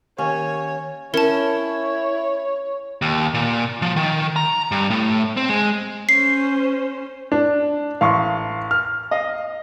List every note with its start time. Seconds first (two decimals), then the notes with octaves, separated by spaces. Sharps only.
0.19 D#2 C#4 C#5
1.14 C#4 E4 A#4 C#5 A5
3.02 D#2
3.34 A#2
3.82 F3
3.96 D#3
4.36 A#5
4.71 G2
4.90 A2
5.37 C4
5.49 G#3
6.09 C#4 C5 C7
7.32 D4
8.01 A1 F5 C6 C#6
8.71 F6
9.11 D#5 F5